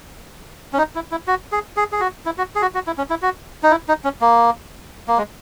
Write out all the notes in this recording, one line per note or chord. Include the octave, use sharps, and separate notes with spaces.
C#4
D#4
E4
E4
F#4
G#4
G#4
G#4
F#4
E4
F#4
G#4
F#4
F#4
E4
C#4
E4
F#4
D#4
E4
D#4
C#4
A#3
A#3
G#3